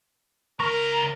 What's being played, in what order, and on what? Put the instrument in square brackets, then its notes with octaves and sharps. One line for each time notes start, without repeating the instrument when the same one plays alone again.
[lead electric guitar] C#2 A#5 [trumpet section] A#4 [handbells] C#6 A#6